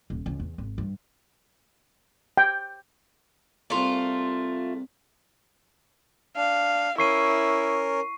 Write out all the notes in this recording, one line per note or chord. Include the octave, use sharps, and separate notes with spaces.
D#1
C#2
E2
G#1
G2
G5
C2 A3 A#3 F4
D4 F5
C#4 E4 A#4 C#6 C7 D#7